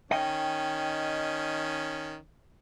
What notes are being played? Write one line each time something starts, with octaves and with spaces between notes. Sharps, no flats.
D#3 C#4 D#5 G5